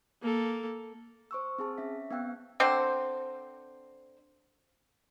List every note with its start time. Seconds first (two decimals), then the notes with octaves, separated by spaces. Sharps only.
0.22 A#3 A4
1.31 C5 C#6 E6
1.58 C4 G#4 A5
1.77 C#4 E5 B6
2.11 B3 C4 F5 G5 E6 F#6
2.60 D3 C4 C5